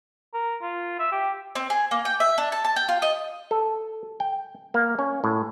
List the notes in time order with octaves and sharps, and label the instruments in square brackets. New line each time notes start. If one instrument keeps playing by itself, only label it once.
[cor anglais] A#4
F4
E5
G4
[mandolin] C4
G#4
A#3
G5
E5
D4
A5
A5
G5
F4
D#5
[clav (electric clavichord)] A4
G5
A#3
C#4
A2